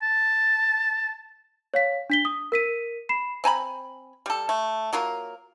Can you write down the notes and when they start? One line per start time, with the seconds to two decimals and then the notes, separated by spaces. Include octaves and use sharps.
0.02 A5
1.74 C#5 F5 B6
2.10 D4 B6 G7
2.25 D#6
2.52 A#4 B6 D#7
3.09 B5 C7 E7
3.44 C4 G#5 A#5 B5
4.26 G3 A4
4.49 A3
4.93 F#3 A#3 F4 A#4